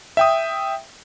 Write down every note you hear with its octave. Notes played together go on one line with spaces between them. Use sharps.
E5 G5 D#6